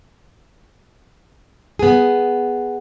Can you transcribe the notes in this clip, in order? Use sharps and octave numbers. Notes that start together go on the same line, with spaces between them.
B3 G#4